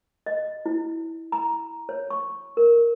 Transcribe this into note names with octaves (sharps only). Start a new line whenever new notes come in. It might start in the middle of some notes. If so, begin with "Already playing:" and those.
D#5
E4
A#5
C#5
C#6
A#4